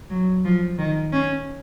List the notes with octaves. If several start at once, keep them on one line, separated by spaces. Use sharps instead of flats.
F#3
F3
D#3
C#4